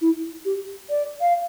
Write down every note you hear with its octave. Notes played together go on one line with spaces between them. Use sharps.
E4
G4
D5
F5